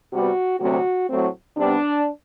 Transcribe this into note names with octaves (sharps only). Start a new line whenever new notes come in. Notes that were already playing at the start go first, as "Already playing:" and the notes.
C3 G3 B3 F#4
D2 C3 F#3 A3 C4 F#4
A2 F#3 A3 C4
C3 G3 B3 D4